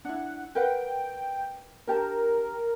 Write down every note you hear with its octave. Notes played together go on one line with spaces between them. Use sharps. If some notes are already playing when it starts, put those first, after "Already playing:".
D4 E4 F#5
A#4 B4 F#5 G5
D4 G4 A#4 A5